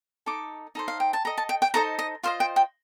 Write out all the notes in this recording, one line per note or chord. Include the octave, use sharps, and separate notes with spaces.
D#4 A4 D6
D#4 A4 C5
F5
G5
A5
A4 D#5 A#5
A5
G5
G5
D#4 A4 C5 D#5 A#5
D#5
F4 C5 D#5 F5
G5
G5